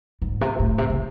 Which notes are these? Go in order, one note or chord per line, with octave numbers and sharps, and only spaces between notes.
G#2
C3
A2
C3
C3